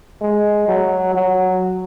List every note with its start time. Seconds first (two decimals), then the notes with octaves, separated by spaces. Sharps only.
0.21 G#3
0.68 F#3
1.15 F#3